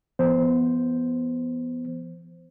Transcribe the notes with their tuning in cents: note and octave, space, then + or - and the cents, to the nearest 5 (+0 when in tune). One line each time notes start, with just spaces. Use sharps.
F3 -45 B3 +0 C5 +0